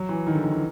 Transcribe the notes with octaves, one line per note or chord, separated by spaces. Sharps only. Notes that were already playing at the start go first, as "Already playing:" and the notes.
Already playing: F#3
E3
D#3
D3
D#3
E3